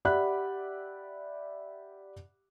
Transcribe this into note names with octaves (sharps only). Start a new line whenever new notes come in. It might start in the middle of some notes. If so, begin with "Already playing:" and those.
G4 D5 E5 F#5 B5 F#6